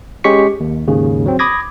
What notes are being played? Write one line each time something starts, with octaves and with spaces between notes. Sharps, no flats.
G#3 C#4 G4 C#6 B6 C#7
D#2
D#2 G#2 C#3
F#3 C4
B5 D6 D#6 G#6 A#6